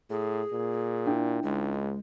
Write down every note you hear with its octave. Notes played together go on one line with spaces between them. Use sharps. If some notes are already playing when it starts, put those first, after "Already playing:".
A2 G#4
A#2
D4 E4 G5
C#2 G#3